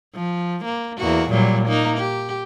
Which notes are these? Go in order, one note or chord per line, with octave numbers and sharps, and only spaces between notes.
F3
A#3
E2 A#3 F#4
A#2 F#3 G3
A#3 D#4
G4